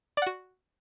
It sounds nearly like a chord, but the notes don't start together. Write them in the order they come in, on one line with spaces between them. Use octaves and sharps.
D5 F#5 F#4